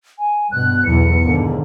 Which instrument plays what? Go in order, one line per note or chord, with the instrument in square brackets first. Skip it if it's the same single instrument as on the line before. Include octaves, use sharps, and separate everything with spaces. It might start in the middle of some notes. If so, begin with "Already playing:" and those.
[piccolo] G#5
[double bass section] G2 B2 [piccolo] F#6
[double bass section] B1 E2 E3 [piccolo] C#7
[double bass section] D#2 G#2 D3